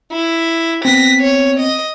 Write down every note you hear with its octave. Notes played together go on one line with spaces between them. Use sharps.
E4
B3 C4 A#6 B6
C#5
D#5